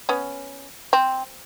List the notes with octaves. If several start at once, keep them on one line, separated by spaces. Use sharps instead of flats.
B3 C#4
C4